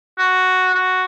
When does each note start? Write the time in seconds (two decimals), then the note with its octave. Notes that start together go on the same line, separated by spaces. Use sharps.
0.19 F#4
0.74 F#4